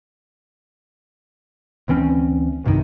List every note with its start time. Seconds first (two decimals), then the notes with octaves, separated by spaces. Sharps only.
1.88 D2 E3 C4 C#4
2.64 B1 G2 C3 D#3